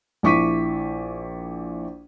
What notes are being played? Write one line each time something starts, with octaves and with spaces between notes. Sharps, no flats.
A#1 E4 C#6 D6 B6 D#7